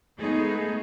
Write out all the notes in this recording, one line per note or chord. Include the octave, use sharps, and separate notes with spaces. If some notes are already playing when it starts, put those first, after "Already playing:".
G#3 A3 B3 D#4 G#4